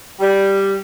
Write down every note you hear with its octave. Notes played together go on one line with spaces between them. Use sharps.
G3